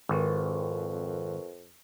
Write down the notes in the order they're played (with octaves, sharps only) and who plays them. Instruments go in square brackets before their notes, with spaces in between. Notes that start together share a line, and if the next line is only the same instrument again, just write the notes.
[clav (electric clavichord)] G#1 [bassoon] F2 [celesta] A#4 B4 C#6